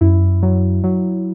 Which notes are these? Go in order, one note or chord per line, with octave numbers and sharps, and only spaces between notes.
F#2 E4
F#3
F#3